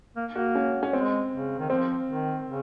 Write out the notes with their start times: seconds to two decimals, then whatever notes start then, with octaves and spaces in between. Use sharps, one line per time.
0.16 A#3
0.34 A#3 F#4
0.55 C#4
0.83 C#4
0.93 G#3 C4
1.32 C#3
1.59 D#3
1.70 F3 C4
2.09 D#3
2.47 C#3